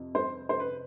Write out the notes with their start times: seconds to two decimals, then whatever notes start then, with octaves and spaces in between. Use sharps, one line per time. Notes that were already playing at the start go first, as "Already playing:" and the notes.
Already playing: F2 C3
0.15 C5
0.49 C5
0.60 B4